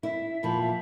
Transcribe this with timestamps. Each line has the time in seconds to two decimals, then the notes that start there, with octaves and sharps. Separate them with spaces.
0.03 E4 E5
0.43 E2 A#2 F3 B5
0.61 E5